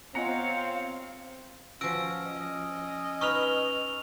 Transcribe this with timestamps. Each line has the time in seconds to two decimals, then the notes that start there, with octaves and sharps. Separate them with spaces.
0.15 B3 C4 F4 C#5 D#5 F5 F#5 A#5
1.81 F3 C#4 F#4 E6 D7
2.27 D#5
3.21 D#4 B4 C#6 F6 F7